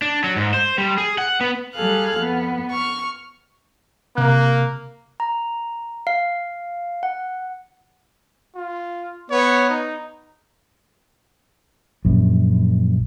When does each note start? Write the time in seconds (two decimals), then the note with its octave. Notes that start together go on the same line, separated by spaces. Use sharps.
0.02 D4
0.24 F#3
0.37 G#2
0.54 C5
0.78 G3
0.98 G#4
1.18 F#5
1.41 B3
1.74 G3 G#4 A4 F5 F#6
2.16 F2 B3
2.71 C#6 F6
4.17 C3 A#3 F#6
5.20 A#5
6.07 F5
7.03 F#5
8.56 F4
9.30 B3 C#5
9.69 D#4
12.05 A#1 F#2